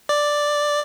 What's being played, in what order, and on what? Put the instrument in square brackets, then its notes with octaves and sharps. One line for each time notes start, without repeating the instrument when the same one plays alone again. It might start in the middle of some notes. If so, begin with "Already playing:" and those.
[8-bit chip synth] D5